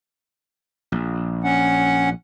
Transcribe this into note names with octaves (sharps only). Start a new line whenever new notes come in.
A#1
C#4 F#5